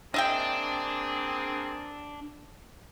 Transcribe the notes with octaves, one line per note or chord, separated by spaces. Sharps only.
A#3 C4 D4 G#4 D#5 E5 G5